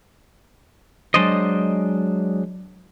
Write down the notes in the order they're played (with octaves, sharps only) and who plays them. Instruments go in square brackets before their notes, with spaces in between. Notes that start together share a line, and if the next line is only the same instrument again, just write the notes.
[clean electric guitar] F#3 G#3 D4 C5 D5 D#5